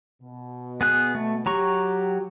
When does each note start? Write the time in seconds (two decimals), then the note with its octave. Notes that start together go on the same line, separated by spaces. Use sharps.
0.22 B2
0.81 B3 G#4 F#6
1.15 A3
1.46 F#3 G4 A#5 C#6